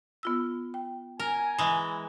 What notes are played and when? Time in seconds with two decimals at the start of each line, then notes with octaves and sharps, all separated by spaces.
0.23 B3 F4 E6
0.74 G5
1.20 A#4 G#5
1.58 E3 G#3